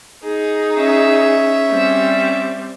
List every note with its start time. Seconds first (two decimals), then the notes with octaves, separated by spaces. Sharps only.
0.24 D#4 G#4
0.76 C#4 E5
1.70 G3 C4